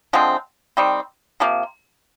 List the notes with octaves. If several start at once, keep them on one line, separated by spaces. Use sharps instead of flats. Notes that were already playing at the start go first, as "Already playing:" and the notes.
D3 F3 G#3 C4
D#3 G3 C4
C3 F3 A#3